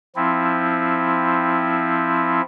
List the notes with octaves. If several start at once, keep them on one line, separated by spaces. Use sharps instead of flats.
F3 C4 E4